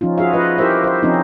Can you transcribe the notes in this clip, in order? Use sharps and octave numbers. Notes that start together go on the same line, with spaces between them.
F3 C#4 D#4 F4
F4 F#4 G#4 E5 F5
F4 B4 D#5
E4 G4 A#4 C5 E5
C5 E5
F3 C4 C#4 D#4